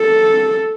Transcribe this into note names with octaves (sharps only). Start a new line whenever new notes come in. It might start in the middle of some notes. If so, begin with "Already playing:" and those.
Already playing: A4